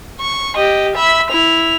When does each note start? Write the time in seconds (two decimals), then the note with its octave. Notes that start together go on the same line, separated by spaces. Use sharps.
0.20 C#6
0.57 G4 D#5
0.95 E5 B5
1.30 E4 F7